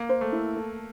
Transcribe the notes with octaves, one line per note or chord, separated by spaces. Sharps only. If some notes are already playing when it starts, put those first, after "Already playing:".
Already playing: A#3
C5
A3
E4
A4